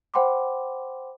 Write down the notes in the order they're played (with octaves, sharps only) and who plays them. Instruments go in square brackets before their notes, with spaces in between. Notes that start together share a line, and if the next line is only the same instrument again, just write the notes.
[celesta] C5 F#5 G5 B5 C6 D6